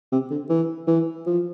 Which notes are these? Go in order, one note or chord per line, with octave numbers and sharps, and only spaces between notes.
C3
D3
E3
E3
F3